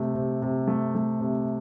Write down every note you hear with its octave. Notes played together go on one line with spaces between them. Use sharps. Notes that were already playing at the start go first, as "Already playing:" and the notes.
Already playing: C3 A3
C3
C3
A3
A3
C3